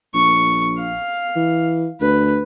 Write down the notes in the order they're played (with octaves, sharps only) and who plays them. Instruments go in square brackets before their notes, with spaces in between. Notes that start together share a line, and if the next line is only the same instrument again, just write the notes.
[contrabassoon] A#1 [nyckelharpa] C#6
[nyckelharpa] F5
[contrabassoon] E3
[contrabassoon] D2 [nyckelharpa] B4